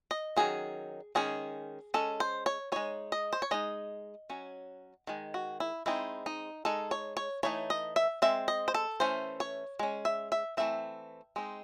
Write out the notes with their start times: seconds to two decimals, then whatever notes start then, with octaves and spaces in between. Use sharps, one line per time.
0.11 D#5
0.36 D#3 F#3 C#4 G#4
1.15 D#3 G#3 C#4 G#4
1.94 G#3 C#4 A4
2.20 C5
2.46 C#5
2.72 G#3 D#4 C#5
3.12 D#5
3.33 C5
3.42 C#5
3.51 G#3 D#4 D#5
4.30 F#3 C#4
5.07 D#3 G#3
5.34 F#4
5.60 E4
5.86 G#3 C4 D#4 E4
6.26 D#4
6.65 G#3 D#4 A4
6.91 C#5
7.17 C#5
7.43 E3 A3 D#4 C#5
7.70 D#5
7.96 E5
8.22 G#3 C4 E5
8.48 D#5
8.68 C5
8.74 A4
9.00 E3 A3 C#4 C5
9.40 C#5
9.79 G#3 C#4
10.05 E5
10.32 E5
10.57 E3 A3 C4 E5
11.36 G#3 C4 D#4